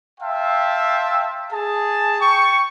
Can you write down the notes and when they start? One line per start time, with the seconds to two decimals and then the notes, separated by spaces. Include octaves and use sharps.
0.20 E5 F5 G5 A5 C6
1.52 G#4 A5
2.20 G5 C#6